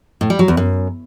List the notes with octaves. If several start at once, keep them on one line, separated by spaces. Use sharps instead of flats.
A2
G3
F#3
E2
F#2